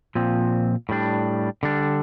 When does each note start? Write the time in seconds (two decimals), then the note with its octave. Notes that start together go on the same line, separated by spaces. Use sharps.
0.15 A#2 F3 C4
0.89 A2 G3 D4
1.63 D3 G3 D4